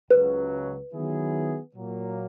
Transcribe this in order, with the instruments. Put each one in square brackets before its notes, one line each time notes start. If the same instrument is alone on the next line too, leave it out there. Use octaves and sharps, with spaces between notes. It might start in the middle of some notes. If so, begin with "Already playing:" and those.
[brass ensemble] C#2 C#3 F#3 [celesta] B4
[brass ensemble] D#3 F#3 B3 E4 G#4
A#2 F#3 A#3